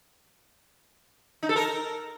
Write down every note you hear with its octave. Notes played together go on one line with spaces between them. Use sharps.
D#4
A4
A#4